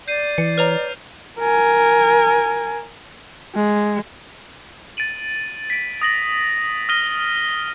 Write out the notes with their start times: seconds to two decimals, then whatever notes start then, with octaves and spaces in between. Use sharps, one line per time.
0.08 D5 G6 C7 D#7
0.38 E3 C#7
0.58 B4 C#5 A#5 F6 F7
1.40 A#4 G#5
3.55 G#3
4.97 A6 D7 D#7 F#7
5.70 B6 D7
6.02 D#6 A#6 F#7
6.89 D#6 F6 A#6 D#7 G7